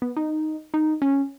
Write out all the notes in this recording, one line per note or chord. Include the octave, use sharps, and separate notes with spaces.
B3
D#4
D#4
C#4